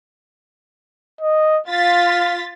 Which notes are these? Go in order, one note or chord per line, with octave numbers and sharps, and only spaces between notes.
D#5
F4 F5 A6 B6